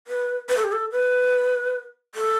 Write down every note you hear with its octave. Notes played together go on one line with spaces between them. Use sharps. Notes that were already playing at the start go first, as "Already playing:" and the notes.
B4
B4
A4
G4
A4
B4
A4